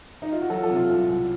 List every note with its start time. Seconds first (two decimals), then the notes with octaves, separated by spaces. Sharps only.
0.22 D#4
0.32 F4
0.41 F#4
0.50 F#3 F4 A4
0.63 F4 A4
0.70 C3
0.76 F4
0.90 C2 F4
1.09 C2